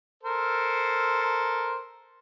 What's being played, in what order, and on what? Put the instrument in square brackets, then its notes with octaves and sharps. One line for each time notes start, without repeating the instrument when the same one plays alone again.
[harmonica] A4 A#4 C5